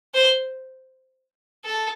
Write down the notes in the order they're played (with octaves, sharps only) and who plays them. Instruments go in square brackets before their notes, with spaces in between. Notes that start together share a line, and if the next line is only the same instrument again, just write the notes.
[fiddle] C5
A4